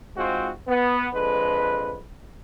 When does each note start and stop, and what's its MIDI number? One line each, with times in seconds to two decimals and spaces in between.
0.17 0.50 44
0.17 0.50 56
0.17 0.50 60
0.17 0.50 65
0.17 0.50 66
0.67 1.07 59
1.14 1.99 41
1.14 1.99 50
1.14 1.99 56
1.14 1.99 71